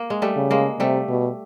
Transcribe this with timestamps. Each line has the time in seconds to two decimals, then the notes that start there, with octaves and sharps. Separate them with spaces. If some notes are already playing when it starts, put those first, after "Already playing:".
Already playing: A#3
0.10 G#3
0.22 G3 A3
0.36 C#3
0.51 G#3 A#3
0.80 C3 G3 A3
1.09 B2